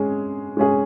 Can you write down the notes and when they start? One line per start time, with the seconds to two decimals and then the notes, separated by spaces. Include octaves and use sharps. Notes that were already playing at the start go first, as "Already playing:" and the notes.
Already playing: G#3 C#4 G#4
0.57 G#3 C#4 G#4